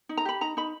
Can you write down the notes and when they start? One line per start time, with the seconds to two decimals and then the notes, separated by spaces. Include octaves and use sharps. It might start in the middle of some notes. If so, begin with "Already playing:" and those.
0.09 D#4
0.17 A#5
0.25 G4 B5
0.41 D#4 A#5
0.57 D#4 B5